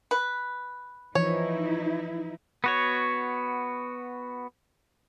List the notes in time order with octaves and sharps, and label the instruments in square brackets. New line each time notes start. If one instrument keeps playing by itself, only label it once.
[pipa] B4
[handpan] E3 F3 [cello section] D#4 E4 [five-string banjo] C#5
[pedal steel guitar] B3 F#4 C#5